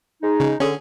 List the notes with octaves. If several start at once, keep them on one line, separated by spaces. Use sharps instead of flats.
G#3 D#4
C#3
D3 C#4 G#4